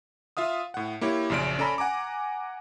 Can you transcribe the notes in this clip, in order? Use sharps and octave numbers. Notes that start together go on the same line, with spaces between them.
F4 E5 F5 D#6
A2 F#5
A#3 E4 G4 C#5
A#1 F#2 C#3 D5 D7
C#4 A4 D5 A#5 B5
F#5 G#5 A#5 D6